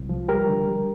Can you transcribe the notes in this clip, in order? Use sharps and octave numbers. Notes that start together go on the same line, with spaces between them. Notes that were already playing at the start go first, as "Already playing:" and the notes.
Already playing: C2
F3
G3 G4 A#4
D3
G3